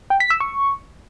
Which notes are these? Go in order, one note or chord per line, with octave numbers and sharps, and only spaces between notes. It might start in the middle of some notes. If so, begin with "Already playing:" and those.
G5
B6
E6
C#6